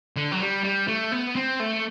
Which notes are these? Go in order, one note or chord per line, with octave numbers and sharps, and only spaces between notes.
D3
F#3
G3
G3
A3
B3
C4
A3